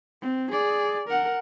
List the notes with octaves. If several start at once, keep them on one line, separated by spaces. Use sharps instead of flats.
C4
G#4 D5
A#4 F#5